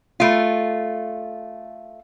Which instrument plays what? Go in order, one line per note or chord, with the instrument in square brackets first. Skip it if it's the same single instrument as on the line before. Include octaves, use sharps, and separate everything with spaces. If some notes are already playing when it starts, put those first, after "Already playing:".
[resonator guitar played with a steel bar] A3 F4